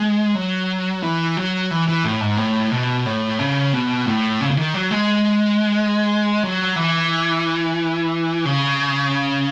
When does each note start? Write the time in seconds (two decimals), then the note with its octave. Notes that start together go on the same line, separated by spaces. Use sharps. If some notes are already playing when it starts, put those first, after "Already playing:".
Already playing: G#3
0.35 F#3
1.03 E3
1.37 F#3
1.71 E3
1.88 E3
2.04 A2
2.21 G#2
2.37 A2
2.71 B2
3.06 A2
3.39 C#3
3.73 B2
4.06 A2
4.41 C#3
4.51 C#3
4.57 D#3
4.74 F#3
4.91 G#3
6.43 F#3
6.76 E3
8.45 C#3